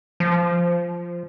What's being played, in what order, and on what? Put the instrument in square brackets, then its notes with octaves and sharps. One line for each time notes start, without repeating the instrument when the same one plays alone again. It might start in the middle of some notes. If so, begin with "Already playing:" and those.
[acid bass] F3